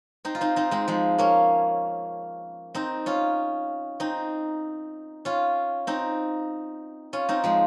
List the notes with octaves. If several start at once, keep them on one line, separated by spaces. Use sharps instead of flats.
C4 D#4
F4
C4 D#4
C4 D#4
G#3 C4
F3 G#3
A#3 C#4
C4 D#4
C#4 F4
C4 D#4
C#4 F4
C4 D#4
C#4 F4
C4 D#4
F3 G#3